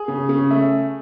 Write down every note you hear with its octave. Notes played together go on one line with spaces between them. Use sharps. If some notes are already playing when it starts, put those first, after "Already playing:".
Already playing: G#4
C#3
C#3
A3